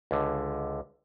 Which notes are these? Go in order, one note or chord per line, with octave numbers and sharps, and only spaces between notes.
C#2 D3